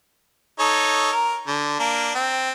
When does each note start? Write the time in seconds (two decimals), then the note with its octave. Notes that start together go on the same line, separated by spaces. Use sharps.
0.60 D#4 A4 C#5
1.12 A#4
1.47 D3
1.79 A#3 D4
2.15 C4